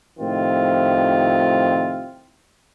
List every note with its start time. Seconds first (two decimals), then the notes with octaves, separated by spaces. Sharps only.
0.20 A2 C3 D#3 F3 C4 F4